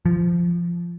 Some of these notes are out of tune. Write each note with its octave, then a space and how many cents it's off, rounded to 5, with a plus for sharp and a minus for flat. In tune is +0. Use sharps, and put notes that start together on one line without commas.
F3 -15